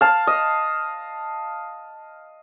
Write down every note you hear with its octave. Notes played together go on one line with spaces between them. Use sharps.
F5 A5
D#5